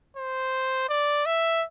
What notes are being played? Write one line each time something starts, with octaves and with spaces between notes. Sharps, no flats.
C5
D5
E5